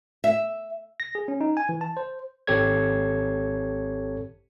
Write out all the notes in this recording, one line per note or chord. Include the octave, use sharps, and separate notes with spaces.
E5
A#6
G#4
C#4
D#4
G#5
E3
A5
C5
G#1 C4 G4 A4 C#5 G#6